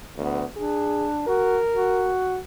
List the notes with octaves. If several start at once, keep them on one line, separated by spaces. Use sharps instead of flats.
D2 B3
D4 G#4
F#4 A#4
F#4